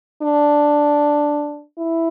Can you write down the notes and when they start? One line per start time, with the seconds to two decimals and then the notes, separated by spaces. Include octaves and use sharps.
0.22 D4
1.78 E4